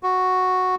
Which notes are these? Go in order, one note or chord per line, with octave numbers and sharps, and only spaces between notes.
F#4